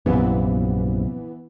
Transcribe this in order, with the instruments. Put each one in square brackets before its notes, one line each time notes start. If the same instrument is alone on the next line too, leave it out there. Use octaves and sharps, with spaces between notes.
[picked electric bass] A#1 F#2 C3 [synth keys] E3 B3